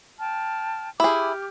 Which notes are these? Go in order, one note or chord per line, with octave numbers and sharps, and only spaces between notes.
G5 A5 F6
E4 G4 G#4 D6 F6